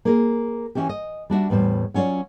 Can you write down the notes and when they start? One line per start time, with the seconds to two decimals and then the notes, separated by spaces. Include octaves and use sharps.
0.05 A#3 G#4 A#4
0.75 E3 C#4 F#4 G4
0.89 D#5
1.30 G3 D4 F#4 E5
1.50 E2 A2 G3 C5
1.94 F#3 C#4 F4 C#5 D5